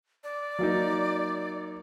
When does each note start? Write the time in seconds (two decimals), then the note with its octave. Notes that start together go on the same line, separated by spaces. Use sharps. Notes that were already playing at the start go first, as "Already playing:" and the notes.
0.24 D5
0.59 F#3 A#3 D#4